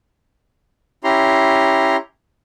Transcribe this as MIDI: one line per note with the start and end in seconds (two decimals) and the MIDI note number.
1.04 1.97 61
1.04 1.97 64
1.04 1.97 67
1.04 1.97 82
1.04 1.97 84